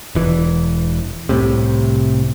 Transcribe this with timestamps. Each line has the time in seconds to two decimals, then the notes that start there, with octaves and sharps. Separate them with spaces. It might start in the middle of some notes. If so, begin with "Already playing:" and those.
0.15 E1 E3
1.29 C2 A2 C3